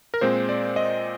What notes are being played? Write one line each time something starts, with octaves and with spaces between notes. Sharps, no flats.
A#4
A#2 G#3 C4 C5
D5
D#5